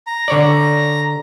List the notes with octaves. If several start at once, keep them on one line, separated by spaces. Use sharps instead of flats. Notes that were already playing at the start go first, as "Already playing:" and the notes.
A#5
D3 C#5 D5